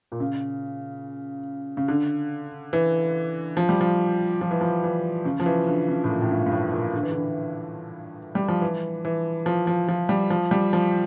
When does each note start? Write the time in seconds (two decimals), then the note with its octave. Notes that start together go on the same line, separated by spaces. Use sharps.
0.12 A#2
0.20 C#3
1.77 C#3
1.88 D3
2.73 E3
3.57 F3
3.69 G3
3.81 F3
4.41 F3
4.51 E3
4.61 F3
4.84 E3
5.25 C#3
5.40 F3
5.46 E3
5.67 D3
5.88 C#3
6.04 A2
6.09 A#2
6.22 A2
6.31 G2
6.46 G2
6.52 A2
6.72 A#2
6.94 D3
7.03 E3
7.12 D3
8.35 G3
8.48 F3
8.61 E3
9.05 E3
9.46 F3
9.67 F3
9.88 F3
10.09 G3
10.30 F3
10.51 G3
10.73 F3